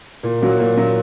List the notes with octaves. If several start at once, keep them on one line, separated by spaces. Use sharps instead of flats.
A#2
F#3 A#3 F#4
A#2
F#3 A#3 F#4